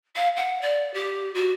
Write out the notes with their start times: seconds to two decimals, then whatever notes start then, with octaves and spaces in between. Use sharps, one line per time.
0.16 F5
0.36 F#5
0.61 D5
0.93 G4
1.34 F#4